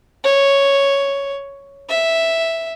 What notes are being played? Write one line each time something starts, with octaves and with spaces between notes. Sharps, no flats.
C#5
E5